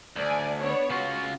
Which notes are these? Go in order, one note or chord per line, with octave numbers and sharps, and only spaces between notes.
D2 D5 G#5
B3 D4 C#5
C#3 F4 F#4